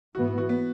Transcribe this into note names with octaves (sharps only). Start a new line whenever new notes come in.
G#2 E3 B3 F#4
F#4
B3